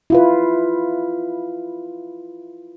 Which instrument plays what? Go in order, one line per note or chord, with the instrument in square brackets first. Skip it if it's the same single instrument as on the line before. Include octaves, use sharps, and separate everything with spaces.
[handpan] E4 F4 B4